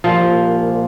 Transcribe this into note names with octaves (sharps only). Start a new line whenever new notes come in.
C2 A#2 F3 A#3